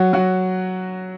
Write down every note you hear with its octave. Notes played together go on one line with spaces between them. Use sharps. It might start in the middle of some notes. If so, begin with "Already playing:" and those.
Already playing: F#3 F#4
F#3 F#4